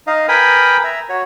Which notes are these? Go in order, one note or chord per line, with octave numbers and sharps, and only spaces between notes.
D#4 D#5 F5
A#4 B4 G5 G#5 B5 D#6
E5 A#5
F#4 C#5